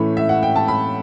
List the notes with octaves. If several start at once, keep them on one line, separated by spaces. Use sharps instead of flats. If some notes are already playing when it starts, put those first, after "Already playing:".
Already playing: A2 E3 A3 C#4 B5
E5
F#5
G5
A5
B5